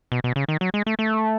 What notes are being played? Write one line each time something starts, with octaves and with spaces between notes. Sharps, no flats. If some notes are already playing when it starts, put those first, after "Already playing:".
B2
B2
C#3
D#3
F#3
G#3
A3
A3